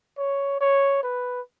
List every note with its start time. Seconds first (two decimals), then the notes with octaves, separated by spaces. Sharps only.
0.18 C#5
0.61 C#5
1.03 B4